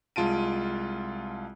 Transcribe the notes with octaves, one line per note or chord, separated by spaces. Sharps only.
C2 G#3 F4 A5 D7 D#7